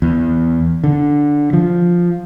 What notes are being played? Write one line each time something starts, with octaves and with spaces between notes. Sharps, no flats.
E2
D3
F3